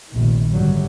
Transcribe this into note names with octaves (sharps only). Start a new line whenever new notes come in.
F1 A#1 D#3
G#1 F#2 D3 F#3 G3